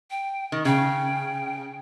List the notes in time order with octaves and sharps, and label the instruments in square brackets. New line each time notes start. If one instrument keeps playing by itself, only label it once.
[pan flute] G5
[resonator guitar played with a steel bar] D#3
[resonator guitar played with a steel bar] C#3 [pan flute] G5